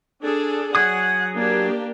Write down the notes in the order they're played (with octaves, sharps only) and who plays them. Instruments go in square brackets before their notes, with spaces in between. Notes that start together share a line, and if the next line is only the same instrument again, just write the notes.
[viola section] D4 G#4 A4
[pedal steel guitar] F#3 G#4 D#6 [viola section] F#5
[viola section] A#3 D4 G4